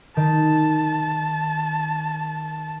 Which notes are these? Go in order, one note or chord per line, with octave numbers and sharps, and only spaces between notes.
D#3 A5